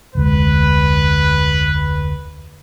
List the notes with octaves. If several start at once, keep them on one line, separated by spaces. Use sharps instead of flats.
F1 D2 G#3 B4